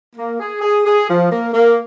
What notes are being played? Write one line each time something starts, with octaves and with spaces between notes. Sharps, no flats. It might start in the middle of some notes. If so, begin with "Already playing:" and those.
A#3
G#4
G#4
G#4
F3
A#3
A#3